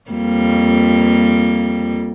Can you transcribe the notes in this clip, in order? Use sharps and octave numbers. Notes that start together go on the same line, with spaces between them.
F2 G3 A#3